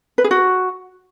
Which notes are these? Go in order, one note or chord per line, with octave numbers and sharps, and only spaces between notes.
B4
G#4
F#4